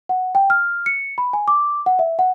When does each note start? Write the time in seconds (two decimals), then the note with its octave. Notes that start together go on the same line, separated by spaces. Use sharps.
0.09 F#5
0.35 G5
0.50 F6
0.86 C#7
1.18 B5
1.33 G#5
1.48 D6
1.86 F#5
1.99 E5
2.19 F#5